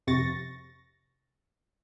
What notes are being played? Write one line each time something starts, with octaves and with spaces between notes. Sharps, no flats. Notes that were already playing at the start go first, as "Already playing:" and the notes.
F2 C3 C#6 A6 A#6